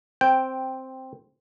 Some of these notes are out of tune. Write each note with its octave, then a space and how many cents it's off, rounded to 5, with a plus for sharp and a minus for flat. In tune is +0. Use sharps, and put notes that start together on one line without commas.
C4 +0 G5 +0